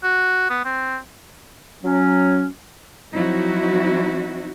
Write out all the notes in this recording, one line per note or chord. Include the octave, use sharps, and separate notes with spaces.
F#4
B3
C4
F#3 C#4
F3 F#3 C4 D#4 E4 F#4